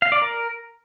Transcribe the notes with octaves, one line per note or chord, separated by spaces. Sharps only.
F5
D5
A#4